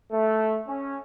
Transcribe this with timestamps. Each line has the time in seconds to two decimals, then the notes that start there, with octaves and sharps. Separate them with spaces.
0.11 A3
0.67 C#4